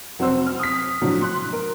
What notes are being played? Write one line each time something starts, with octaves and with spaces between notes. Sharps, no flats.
F1 F#3 C4 F#4 C5 E6
F6
D#6 B6
A2 D3 F3 F#3
C6 F#6
A#4